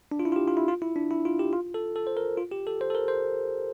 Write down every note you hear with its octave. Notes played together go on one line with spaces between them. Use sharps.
D4
F4
E4
F4
G4
F4
E4
F4
E4
D4
E4
F4
G4
F4
A4
A4
C5
A#4
F4
G4
A4
C5
A4
A#4
C5